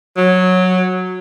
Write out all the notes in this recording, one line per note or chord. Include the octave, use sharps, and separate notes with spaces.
F#3